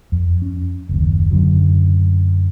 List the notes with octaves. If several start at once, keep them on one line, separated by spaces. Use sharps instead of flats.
F2
C#4
F#1 D#2
F#2 D3 F#3